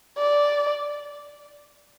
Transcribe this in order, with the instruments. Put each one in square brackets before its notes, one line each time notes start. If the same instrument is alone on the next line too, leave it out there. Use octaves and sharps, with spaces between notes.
[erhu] D5